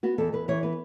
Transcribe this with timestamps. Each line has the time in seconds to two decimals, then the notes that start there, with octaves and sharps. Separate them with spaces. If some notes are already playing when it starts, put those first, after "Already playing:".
0.03 B3 F#4
0.18 E2 A4
0.33 E2 B4
0.48 E3 C#5
0.63 B3 B4